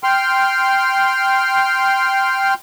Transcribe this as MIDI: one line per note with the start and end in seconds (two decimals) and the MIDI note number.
0.04 2.54 79
0.04 2.54 84
0.04 2.54 89